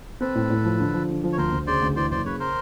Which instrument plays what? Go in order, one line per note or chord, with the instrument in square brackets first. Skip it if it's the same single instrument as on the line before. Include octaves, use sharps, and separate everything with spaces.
[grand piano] C4 [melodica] A4 B4
[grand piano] A2
A2
F3
D3
F3
D3
F3
[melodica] C#5
[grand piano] D2 [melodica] A#4 C5
[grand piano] D2
[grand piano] C#3 [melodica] C5 D5
[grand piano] D2
[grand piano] E3 [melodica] C5 D5
[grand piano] F#1 [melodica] C5 D5
[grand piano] C#3 [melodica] B4 C#5
[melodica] A#4 C5